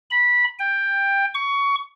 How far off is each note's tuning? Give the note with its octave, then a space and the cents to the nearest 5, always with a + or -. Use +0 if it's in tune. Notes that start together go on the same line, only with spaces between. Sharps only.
B5 -15
G5 +15
C#6 +20